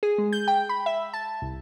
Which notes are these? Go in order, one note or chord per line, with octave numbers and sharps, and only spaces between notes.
G#4
G#3
G6
G5
B5
E5
A5
C2